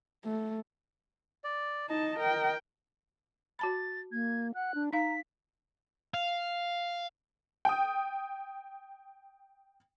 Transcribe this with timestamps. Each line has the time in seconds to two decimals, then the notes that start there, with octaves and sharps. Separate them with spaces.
0.24 A3
1.44 D5
1.90 D#4 D#5 A5
2.19 A#4 G5
3.59 F#4 A5 B5 A6
4.12 A#3 G#6
4.55 F#5 F#6
4.75 D4
4.93 D#4 F5 A#5 B6
6.14 F5
7.65 G5 D#6